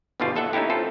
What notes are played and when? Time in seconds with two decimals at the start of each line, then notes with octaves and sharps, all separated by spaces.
0.20 G1 D#2 B2 G3 D4 F4
0.36 D#2 A4 E5 F#5
0.53 A3 C#4 D#4 E4 G4
0.70 C4 F4 A4